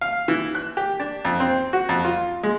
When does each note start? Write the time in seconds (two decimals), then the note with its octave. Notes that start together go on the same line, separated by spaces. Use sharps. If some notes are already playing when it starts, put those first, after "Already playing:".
0.01 F5
0.28 E3
0.55 F#6
0.77 G4
1.00 D4
1.25 F2
1.40 C4
1.73 F#4
1.89 F2
2.05 F4
2.43 G#3